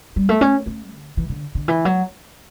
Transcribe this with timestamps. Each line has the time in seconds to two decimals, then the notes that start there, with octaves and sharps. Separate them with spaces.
0.16 G3
0.29 A3
0.41 C#4
0.66 A3
0.92 D3
1.17 E3
1.29 D3
1.55 D3
1.68 E3
1.85 F#3